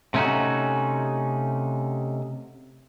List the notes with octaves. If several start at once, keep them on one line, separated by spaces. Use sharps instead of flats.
C3 A3 C#4 D#4 F#4